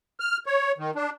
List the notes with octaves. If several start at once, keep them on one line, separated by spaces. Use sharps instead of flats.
F6
C#5
D#3
D4